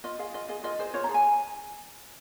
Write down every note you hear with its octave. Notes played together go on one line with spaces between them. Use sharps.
F4 D#5
G#4 F5
F4 D#5
G#4 D#5
F4 D#5
G#4 C5
F4 C#5
G#4 A#5
G#5